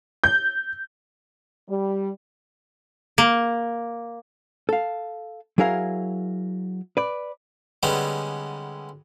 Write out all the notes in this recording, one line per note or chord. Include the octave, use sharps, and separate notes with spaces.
G6
G3
A#3
A4 F5
F#3 E4 G#4 A#4 F5
B4 D5
D3 G3 G#3 B3 C#4 D#4